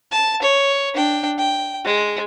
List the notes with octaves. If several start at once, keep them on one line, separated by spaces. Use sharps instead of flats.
A5
C#5
D4 G5
G5
G#3